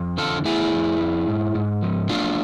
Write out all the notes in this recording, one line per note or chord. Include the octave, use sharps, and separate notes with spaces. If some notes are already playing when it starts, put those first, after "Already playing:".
Already playing: F2
D3 F4 A4
A3 E4 G#4
F2
F2
G#2
G#2
F3
A3 D4 F4